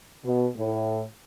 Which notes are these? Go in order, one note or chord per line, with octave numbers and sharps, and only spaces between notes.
B2
A2